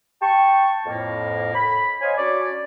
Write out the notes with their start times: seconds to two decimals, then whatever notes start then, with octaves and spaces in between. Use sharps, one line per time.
0.22 G5 A5 C#6
0.86 F2 A2 A#3
1.54 B5
2.01 C5 C#5 D#5 F5 G#5
2.17 C#4 D4 F#4 C#5 D5